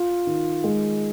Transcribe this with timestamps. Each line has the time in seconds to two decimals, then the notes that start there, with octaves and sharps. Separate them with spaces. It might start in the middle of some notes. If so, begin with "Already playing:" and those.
Already playing: F4
0.27 D#3
0.64 G#3